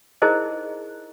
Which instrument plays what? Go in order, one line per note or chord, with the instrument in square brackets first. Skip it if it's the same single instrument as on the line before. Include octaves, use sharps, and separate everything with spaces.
[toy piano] D#4 E4 G#4 A#4 C5 D#5